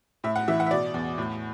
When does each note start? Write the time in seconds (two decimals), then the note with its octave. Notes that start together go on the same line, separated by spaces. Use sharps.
0.24 A2 E5
0.36 F#5
0.48 E3 E5
0.60 F#5
0.66 E5
0.71 B2 D5
0.94 E2
1.18 A2